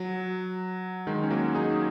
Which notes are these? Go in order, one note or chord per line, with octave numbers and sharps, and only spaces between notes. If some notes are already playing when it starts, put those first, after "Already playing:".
Already playing: F#3
D#3 G#3
C#4
F#3 A#3
D#4 G#4